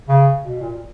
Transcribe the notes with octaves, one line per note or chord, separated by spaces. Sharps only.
C#3
B2
A#2